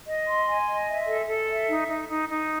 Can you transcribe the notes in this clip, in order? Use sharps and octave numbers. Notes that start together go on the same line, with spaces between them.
D#5
C6
G#5
D#5
E5
A4
A4
E5
D#4
D#4
D#4
D#4